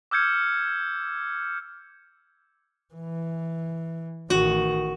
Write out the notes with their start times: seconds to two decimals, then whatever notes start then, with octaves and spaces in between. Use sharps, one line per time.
0.11 D6 E6 F6 G6 G#6 C#7
2.94 E3
4.30 A1 D#3 F#4